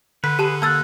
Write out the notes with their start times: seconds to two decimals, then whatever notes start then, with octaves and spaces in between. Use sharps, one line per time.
0.24 D3 B4 B6
0.39 G4 G#4 B4 A5 E7
0.62 A#3 A5 E6 F#6 A6